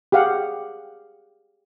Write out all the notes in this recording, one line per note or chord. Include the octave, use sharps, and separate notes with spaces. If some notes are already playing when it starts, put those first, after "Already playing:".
G4 G#4 F5 F#5